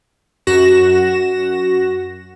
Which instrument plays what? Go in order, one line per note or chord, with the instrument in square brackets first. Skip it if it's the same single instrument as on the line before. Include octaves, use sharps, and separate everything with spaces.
[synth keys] F#2 F#4 A#6 E7